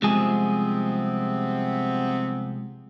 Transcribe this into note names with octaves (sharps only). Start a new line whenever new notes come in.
C2 C3 F3 G#3 B3 C4 G#4